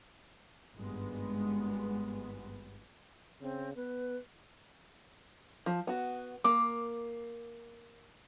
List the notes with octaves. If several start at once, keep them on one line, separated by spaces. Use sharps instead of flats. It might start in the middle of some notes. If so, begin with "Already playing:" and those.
G#1 G2 G#3 B3
C#3 C4
B3 B4
F3
B3 F#4
A#3 D6